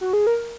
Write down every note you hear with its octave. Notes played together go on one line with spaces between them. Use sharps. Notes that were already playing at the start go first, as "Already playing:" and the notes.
F#4
G#4
A#4